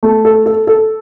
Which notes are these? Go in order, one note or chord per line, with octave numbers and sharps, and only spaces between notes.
A3
A4
A4
A4